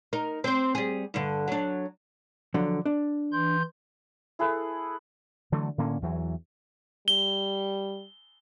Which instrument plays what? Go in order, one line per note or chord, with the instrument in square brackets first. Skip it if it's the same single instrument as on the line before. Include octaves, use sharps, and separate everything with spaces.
[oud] D#4 A#4
C4 C5
G3 G#4
G2 D3
F#3 D4
[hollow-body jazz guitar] D3 F3 F#3
D4
[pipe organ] E3 C6 G6
[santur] E4 G#4 A4 B4
[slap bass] D3 E3 F#3 A3
A2 D3 A#3 C#4
E2 E3 F#3
[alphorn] G3 [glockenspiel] G7